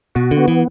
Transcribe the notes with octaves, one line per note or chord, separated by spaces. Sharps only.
B2 F#4
D3
B3
E3